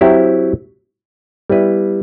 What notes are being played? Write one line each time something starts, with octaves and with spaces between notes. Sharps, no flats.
F#3 C4 E4 G4
G3 B3 E4 B4